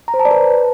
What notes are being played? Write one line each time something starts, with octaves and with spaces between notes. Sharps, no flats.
A#5
C5
A5
D5
B4